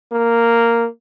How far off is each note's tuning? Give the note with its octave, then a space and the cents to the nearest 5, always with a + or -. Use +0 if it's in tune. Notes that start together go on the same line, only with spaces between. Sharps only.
A#3 -5